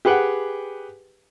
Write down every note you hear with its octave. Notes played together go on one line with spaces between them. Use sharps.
G4 G#4 B4 F#5 G5